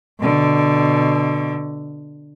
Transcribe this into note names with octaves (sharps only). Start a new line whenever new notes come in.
B2 D3